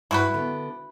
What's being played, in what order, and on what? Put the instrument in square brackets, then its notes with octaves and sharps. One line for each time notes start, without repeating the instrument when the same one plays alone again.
[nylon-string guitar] G2 [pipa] E4 F#4 B4
[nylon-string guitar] D3 B3